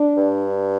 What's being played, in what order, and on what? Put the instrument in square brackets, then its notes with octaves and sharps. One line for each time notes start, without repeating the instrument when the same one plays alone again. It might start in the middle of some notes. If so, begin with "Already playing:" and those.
Already playing: [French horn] D4
[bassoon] G2